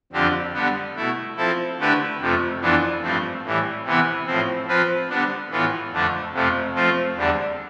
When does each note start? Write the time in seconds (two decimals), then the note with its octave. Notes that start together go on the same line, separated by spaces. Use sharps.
0.13 F2 D3 F3 C4 G4
0.54 D3 G3 B3
0.96 B2 A3 E4
1.36 F3 C4 E4 A4
1.78 D3 A3 E4 G4 B4
2.20 F2 C3 F3 A3
2.60 F2 E3 B3 D4 F4
3.02 G2 F3 A3 C4
3.44 A2 E3 G3
3.84 C3 E3 B3 E4
4.26 A2 F3 C4
4.68 F3 C4 F4 B4
5.09 D3 G3 B3 D4
5.50 A2 E3 B3 F4
5.91 F2 D3 A3 D4
6.33 F2 C3 F3 A3
6.75 F3 A3 C4 F4
7.15 E2 D3 G3 D4